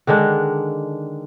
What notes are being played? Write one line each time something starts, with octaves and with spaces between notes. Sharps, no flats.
D3 D#3 G#3 D4